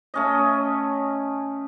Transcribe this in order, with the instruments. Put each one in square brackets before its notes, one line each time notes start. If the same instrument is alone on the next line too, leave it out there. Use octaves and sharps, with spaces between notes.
[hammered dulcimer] A3 C#4 D#5